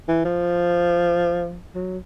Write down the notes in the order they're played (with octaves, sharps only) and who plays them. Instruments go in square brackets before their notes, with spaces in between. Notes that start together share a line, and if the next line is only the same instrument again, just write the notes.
[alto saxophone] E3
F3
F#3